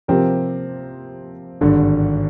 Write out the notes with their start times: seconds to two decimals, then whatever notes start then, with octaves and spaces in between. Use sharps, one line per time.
0.08 C3 F3 C4 G4 A#4
1.61 G#1 G2 D3